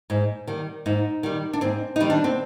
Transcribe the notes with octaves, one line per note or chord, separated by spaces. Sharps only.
G#2
D#3 G3
G#2 D#4
D#3 G3
D4
G#2 C4
D#3 G3 D#4
D4
C4